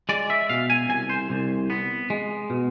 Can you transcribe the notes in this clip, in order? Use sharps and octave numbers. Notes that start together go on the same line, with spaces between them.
G#3 D5
E5
B2 F5
G#5
C2 G#5
C5
C2
B3
G#3
B2